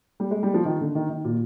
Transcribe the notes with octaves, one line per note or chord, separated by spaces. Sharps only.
G3
G#3
G3
F3
D#3
D3
D#3
D#3
A#2